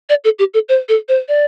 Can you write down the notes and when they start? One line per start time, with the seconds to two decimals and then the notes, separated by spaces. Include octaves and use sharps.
0.09 D5
0.24 A4
0.39 G4
0.54 A4
0.69 C5
0.89 A4
1.09 C5
1.28 D5